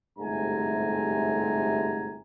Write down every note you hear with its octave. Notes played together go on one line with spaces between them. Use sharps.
G1 G#2 C3 A3 G#5 A#5